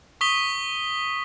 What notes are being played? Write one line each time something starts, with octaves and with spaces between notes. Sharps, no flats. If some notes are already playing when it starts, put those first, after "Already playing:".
C#6 D#6 B6 G7